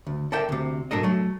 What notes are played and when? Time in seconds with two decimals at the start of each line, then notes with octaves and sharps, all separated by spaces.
0.07 D2
0.32 A4 A#4 D5 E5 G5
0.49 D2 C3
0.91 B1 G#2 D4 A4 A#4 D#5
1.03 F#3 A3